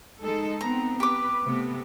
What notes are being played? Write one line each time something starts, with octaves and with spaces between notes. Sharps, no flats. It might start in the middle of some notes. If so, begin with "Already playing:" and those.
G#3 D#4 A4
B3 C4 A#5
G4 B4 D6
C3 A3 B3